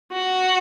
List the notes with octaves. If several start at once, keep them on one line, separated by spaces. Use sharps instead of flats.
F#4